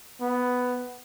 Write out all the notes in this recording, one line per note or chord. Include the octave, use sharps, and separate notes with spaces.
B3